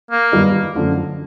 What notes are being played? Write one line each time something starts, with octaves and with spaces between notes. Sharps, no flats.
A#3
G2 D#3 G3 B3 D#4
F#2 D3 F3 A3